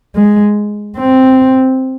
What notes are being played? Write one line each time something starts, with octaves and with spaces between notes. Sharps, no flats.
G#3
C4